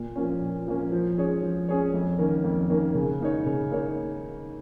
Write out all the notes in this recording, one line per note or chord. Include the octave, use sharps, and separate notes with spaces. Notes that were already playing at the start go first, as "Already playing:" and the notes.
Already playing: A#2
F3 A#3 C#4
A#2
F3 A#3 C#4
F3
C#4 G#4 C#5
F3
C#4 G#4 C#5
F2
D#3 A#3 C#4 A#4
F2
D#3 A#3 C#4 A#4
C#3
A#3 D#4 C#5
C#3
A#3 D#4 C#5